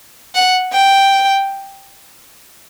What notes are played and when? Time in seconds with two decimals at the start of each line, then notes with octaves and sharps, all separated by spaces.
0.35 F#5
0.72 G5